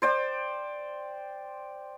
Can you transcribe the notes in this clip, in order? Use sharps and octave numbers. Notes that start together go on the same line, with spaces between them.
C5 D5 G5